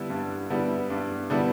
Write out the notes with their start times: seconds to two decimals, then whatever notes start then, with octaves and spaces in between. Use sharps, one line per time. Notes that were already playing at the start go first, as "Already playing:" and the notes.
Already playing: D3 G3 B3 E4
0.10 G2
0.50 D3 G3 B3 E4
0.90 G2
1.30 D3 G3 B3 E4